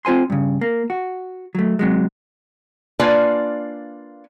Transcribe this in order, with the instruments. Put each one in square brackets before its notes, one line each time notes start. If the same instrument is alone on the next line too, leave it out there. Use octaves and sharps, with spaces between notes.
[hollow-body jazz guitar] C4 F4 C5 G#5 C6
G2 C#3
A#3
F#4
F#3 A3
C3 F#3 G#3
[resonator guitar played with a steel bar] A#3 D4 F4 B4 D5 G#5